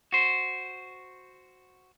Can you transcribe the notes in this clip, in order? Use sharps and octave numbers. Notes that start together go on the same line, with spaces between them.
F#4 C5